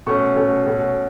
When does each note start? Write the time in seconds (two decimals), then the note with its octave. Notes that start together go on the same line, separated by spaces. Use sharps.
0.06 B2 A3 C#4 C#6
0.36 B2 A3 C#4
0.66 B2 A3 C#4